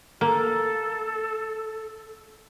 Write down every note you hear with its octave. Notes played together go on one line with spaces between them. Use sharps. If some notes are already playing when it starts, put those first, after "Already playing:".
A#3 A4